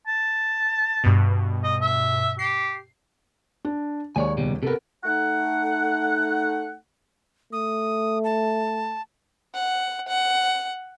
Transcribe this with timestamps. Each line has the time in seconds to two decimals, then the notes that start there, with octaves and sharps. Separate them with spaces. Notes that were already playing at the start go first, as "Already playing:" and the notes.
0.07 A5
1.04 G2 B2
1.64 D#5
1.82 E5
2.39 G4 C7
3.65 D4
4.16 D#2 G#3 C#5 D5 G#5
4.37 C#2 B2 G3
4.63 C3 B3 A4 A#4
5.05 A3 D#4 F#5
7.52 A3 D#6
8.24 A5
9.54 F#5
10.08 F#5